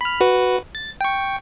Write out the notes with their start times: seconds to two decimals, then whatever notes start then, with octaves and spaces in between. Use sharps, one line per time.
0.01 B5 F6
0.21 F#4 B4
0.75 A6
1.01 G5 C#6